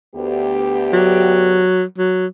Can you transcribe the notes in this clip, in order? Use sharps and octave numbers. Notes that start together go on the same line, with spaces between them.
D2 B3 G4
F#3
F#3